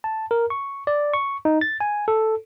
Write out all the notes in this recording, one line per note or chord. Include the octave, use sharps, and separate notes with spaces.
A5
A#4
C#6
D5
C#6
D#4
A6
G#5
A4